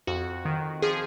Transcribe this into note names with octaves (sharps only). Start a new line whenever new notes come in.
F2 F#4
D#3
F3 G#4